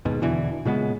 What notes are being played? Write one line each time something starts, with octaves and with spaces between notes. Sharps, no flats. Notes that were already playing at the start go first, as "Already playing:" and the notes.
D#2 G#2 B2
E2 B2 D3 E3
A#2 C#3 G#3 B3